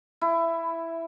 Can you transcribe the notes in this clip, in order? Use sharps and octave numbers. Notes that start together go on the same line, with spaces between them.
E4